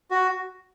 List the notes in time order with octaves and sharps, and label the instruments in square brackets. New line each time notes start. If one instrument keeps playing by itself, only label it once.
[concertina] F#4